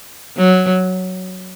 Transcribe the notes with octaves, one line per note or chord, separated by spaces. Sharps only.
F#3